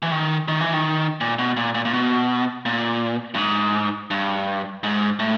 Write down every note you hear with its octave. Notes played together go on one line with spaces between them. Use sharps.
E3
D#3
D#3
E3
D#3
A#2
B2
A#2
A#2
A#2
B2
A#2
G2
G#2
G2
G#2
A2